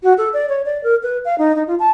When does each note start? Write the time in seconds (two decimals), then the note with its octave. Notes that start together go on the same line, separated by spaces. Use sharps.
0.03 F#4
0.18 A4
0.34 D5
0.49 C#5
0.65 D5
0.84 A#4
1.03 B4
1.25 F5
1.38 D#4
1.56 D#4
1.67 F4
1.79 A5